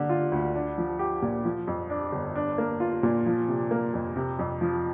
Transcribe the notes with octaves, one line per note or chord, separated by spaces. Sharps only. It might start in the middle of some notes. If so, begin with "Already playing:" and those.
Already playing: D3 A#3
F4
D2
D4
F3
G4
A#2
F3
F2
D4
G1
D4
A#3
F4
A#2
F3
C3
A#3
F2
C3
F2
F3